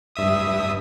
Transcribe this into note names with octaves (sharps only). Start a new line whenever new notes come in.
G2 E5 D#6